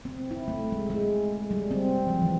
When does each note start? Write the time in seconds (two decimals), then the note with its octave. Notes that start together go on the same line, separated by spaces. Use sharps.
0.05 C4
0.31 E4
0.48 A3
0.72 G#3
0.90 G#3
1.51 G3
1.71 C4
2.07 F3
2.22 E3